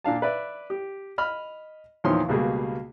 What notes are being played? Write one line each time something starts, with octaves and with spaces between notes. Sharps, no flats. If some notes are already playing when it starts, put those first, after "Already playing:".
A#2 D4 F5 A5
B4 D5 E5
G4
D#5 B5 F6
E2 A#2 D#3 F3 C#5 C6
C#2 B2 G3 A#3 G#4